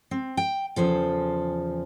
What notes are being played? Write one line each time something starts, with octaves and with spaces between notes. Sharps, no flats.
C4
G5
E2 C#3 F3 A4